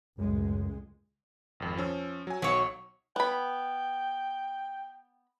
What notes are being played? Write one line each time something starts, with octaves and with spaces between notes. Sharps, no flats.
C#2 F#2 A2 G#3
G#1 F2
F3 C#4 E6
F#3 G#5
B1 F#3 C#5
B3 G5 B5